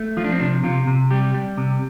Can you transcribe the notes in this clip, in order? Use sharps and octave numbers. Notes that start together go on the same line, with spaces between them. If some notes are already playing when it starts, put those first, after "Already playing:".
Already playing: A3
F3 F4
D4
C4
C3 D4
C3 F4
C3
G3 G4
G3
C3